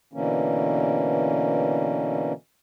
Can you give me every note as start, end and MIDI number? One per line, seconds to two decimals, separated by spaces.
0.13 2.33 47
0.13 2.33 50
0.13 2.33 52
0.13 2.33 58
0.13 2.33 61